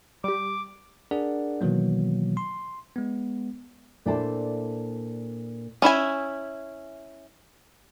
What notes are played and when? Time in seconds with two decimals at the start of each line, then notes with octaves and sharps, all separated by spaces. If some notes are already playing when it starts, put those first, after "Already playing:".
0.24 G3 G4 D6
1.11 D4 G#4 A#4 D5 F#5
1.61 B2 D#3 E3 F#3 A#3
2.37 C6
2.96 G#3 B3
4.06 A#2 D4 E4 A4 C5 A5
5.82 C#4 E4 E5 G#5